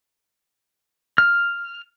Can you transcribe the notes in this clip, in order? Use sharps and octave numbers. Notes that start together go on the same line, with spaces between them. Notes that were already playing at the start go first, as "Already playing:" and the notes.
F6